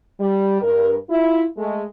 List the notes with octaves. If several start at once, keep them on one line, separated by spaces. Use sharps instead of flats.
G3
G2 A#4
E4 F4
G#3 A3